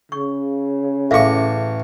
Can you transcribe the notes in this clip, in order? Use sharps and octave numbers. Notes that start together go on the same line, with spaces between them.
C#3 C#6
A1 E5 F5 C#6 D6